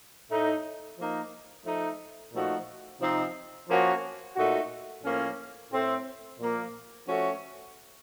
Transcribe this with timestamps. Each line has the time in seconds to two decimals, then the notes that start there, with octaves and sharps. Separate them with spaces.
0.29 A2 A3 D#4
0.97 F3 A#3 D#4
1.65 F3 A3 D#4
2.32 A#2 F3 A3 D#4 F#4
3.00 C3 F3 C4 D#4
3.68 F3 A#3 C#4 F#4
4.35 A#2 A3 D#4 F#4
5.04 A2 F3 A#3 C#4
5.71 A2 A3 C4
6.39 A#2 F3 A#3 F4
7.07 F3 A3 C#4 F#4